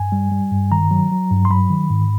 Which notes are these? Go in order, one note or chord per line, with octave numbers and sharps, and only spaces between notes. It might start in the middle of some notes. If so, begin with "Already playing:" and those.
Already playing: G2 G#5
G3
G3
G2
D#3 A#5
F#3
F#3
G2
C6
F#3 B5
D#3
G#2